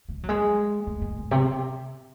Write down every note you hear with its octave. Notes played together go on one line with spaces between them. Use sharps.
G#3
F#3
G#3
A3
G#3
A2
C3